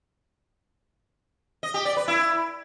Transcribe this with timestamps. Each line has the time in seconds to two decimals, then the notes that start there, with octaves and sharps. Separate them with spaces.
1.63 D#5
1.74 G4
1.85 D5
1.97 B4
2.08 E4